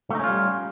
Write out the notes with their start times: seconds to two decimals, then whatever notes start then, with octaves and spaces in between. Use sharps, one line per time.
0.10 A3
0.15 D#4
0.19 C#4
0.24 F4
0.28 G3